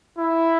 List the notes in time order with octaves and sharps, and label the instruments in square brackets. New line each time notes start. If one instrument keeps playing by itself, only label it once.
[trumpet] E4